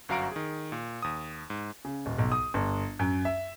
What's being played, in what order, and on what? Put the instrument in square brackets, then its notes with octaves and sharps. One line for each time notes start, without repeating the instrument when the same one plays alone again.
[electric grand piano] G1 F#2 F#4 F5 A#5 D7
D#3 G#4
A#2
D#2 D#6
G#2
[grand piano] C#3
D#1
B1
D#6
G1
F#2
E5